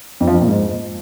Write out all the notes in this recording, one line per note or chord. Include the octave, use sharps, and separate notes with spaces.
F2
F3
F2
A#2
G#2